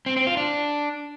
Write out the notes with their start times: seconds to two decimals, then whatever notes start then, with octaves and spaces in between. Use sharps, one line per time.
0.06 C4
0.17 C4
0.27 F4
0.37 D4